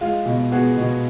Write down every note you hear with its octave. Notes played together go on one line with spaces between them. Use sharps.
G#3 F4
B2
B3 F#4 G#4
B2